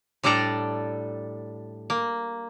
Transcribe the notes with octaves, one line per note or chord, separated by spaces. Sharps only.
A2 G3 D4 A4 D5 A#5
A#3